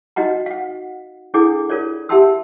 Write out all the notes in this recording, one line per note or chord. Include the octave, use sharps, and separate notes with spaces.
D#4 F#4 D#5 F#5 A#5
F5 F#5
D4 E4 G#4 A4 F#5 D6
F4 A#4 C#5 D5
G4 E5 F#5 A5 C6 E6